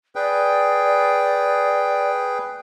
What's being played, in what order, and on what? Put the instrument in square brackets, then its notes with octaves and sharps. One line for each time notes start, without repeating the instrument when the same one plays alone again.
[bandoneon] G#4 B4 G5 [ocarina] D5